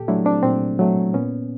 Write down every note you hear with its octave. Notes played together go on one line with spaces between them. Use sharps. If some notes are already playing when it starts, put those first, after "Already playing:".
Already playing: A#2 G4 A4
F#3 A3 D4 E4
C4 D4
A#2 C4
F#3 A3
A#2 B3 C#4